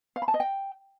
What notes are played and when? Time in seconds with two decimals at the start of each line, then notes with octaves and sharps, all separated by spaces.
0.16 F5
0.22 B5
0.28 A5
0.34 D#5
0.40 G5